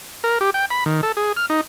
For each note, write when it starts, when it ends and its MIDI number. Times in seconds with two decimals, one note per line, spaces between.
0.24 0.38 70
0.41 0.50 67
0.54 0.65 79
0.70 0.84 83
0.86 1.01 51
1.03 1.12 69
1.17 1.32 68
1.37 1.46 89
1.49 1.61 63